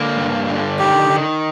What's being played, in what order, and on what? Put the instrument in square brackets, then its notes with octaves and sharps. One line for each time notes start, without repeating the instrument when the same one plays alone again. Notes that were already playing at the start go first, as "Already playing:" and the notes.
Already playing: [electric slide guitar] D3 A#3
G2
D3
[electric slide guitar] D#3 [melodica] G4
[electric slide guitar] D#3